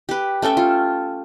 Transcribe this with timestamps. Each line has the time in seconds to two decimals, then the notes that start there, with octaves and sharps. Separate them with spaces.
0.09 G4 B4
0.42 A3 C#4 A4 G5
0.57 F4